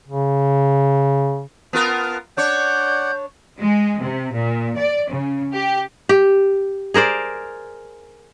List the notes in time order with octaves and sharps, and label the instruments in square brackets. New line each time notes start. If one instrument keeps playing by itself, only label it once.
[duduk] C#3
[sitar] B3 F4 A#4 [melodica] A5
[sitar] D4 C#5 [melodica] D5 F#5 [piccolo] G6
[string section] G#3
C3
A#2
D5
C#3
G4
[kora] G4
G#4 A#4 C5 D5